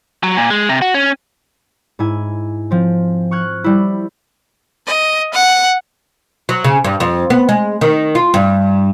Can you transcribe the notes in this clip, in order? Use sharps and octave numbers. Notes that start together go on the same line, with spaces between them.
F#3
A#2
G#3
C3
F#4
C#4
G#2 E4 G#5
F3 C4
C#6 F6 F#6 G#6
G3 E4
D#5
F#5
F#3
C#3
G2
F2
B3
G#3
D#3
F4
G2